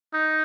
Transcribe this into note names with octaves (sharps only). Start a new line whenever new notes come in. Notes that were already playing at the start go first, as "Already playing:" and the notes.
D#4